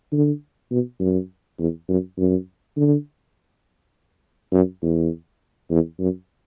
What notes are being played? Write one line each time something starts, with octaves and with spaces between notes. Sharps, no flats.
D3
B2
F#2
E2
F#2
F#2
D3
F#2
E2
E2
F#2